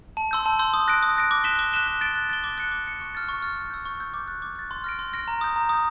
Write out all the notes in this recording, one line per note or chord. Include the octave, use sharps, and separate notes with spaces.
A5
C6 E6 G6
A5
C6 E6 G6
D#6
F#6 A#6 D7
D#6
F#6 A#6 D7
D6
F#6 B6 E7 G7
D6
F#6 B6 E7 G7
F#6
A6 D7 G7
F#6
A6 D7 G7
D6
F#6 A6 C#7
D6
F#6 A6 C#7
C#6
F6 A6
C#6
F6 A6
C#6
E6 G6
C#6
E6 G6
D6
F#6 A6
D6
F#6 A6
C6
F6 A#6 D7
C6
F6 A#6 D7
A#5
D#6 G6
A#5
D#6 G6